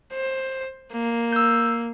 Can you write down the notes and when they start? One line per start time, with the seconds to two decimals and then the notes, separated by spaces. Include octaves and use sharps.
0.12 C5
0.92 A#3
1.33 E6 G6